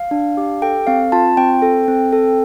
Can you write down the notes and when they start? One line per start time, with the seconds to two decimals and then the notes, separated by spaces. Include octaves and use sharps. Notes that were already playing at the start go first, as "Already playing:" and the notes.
Already playing: F5
0.11 D4
0.37 G4
0.62 A4 G5
0.87 C4 F5
1.12 F4 A5
1.37 C4 G5
1.62 A4
1.88 C4
2.12 A4